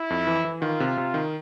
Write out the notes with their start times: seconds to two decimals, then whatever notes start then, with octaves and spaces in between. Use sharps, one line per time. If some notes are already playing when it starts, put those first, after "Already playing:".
Already playing: E4
0.10 F2
0.27 E3
0.45 E3
0.62 D#3 F4
0.80 C3
0.97 C3
1.14 D#3